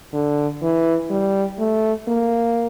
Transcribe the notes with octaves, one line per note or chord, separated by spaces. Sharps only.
D3
E3
G3
A3
A#3